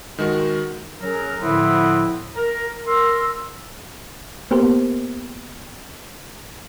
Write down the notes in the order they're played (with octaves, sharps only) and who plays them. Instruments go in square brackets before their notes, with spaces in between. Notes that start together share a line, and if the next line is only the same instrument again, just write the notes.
[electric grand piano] D#3 G#3 F#4 A#4
[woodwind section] F#3 C#4 G#4 A#4
A2 D3 F3 B3 C4 E4
A#4
A#4 C6 E6
[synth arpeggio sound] A#3 B3 G4 A#4 C5